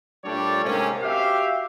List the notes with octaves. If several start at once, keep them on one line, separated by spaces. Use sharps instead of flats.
A#2 G3 A3 D4 C#5 D5
G#2 C3 A#3 C4 C#4
F#4 G4 E5 F5